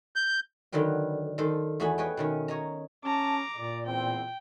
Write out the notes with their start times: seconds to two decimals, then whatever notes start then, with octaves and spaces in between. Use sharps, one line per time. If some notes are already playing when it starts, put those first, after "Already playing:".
0.16 G6
0.72 D3 D#3 F#3 B4 G5
1.38 D#3 A4 C5
1.80 E2 A3 F#4 G#4 B5
1.98 B4 C#5 D#5 G5
2.17 B2 D#3 C#4
2.48 C#5 D#5 A#5
3.05 C#4 A5 A#5 D6
3.57 A#2 D5
3.87 E2 B3 C4 G5